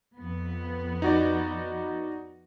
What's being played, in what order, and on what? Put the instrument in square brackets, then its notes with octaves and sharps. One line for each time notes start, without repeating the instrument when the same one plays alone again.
[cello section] F2 B3
[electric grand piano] D#4 F#4 D5